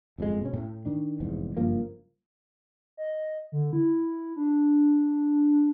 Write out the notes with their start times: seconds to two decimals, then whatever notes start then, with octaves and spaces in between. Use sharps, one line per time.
0.18 G1 F2 A2 G#3
0.41 B2 C#4
0.53 A2
0.85 D#3 D4
1.20 F1 E2 G#2
1.57 F#1 G2 F3 A#3
2.97 D#5
3.52 D3
3.73 E4
4.36 D4